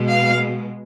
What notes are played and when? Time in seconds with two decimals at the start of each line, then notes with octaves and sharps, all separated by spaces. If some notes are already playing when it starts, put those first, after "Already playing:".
Already playing: B2 G#3
0.08 F5